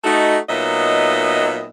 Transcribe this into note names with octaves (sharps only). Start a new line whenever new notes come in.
A3 D#4 F#4
A#2 F#3 B3 D#4 D#5 E5